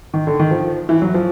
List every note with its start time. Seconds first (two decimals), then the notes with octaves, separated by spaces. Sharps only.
0.14 D#3
0.27 D3
0.39 D#3
0.51 F3
0.89 E3
1.02 F#3
1.14 F3